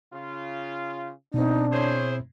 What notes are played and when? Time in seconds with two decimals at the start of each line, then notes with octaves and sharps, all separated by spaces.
0.14 C#3 F4
1.34 B2 C4 D4 D#4
1.72 E4 G#4 C5 C#5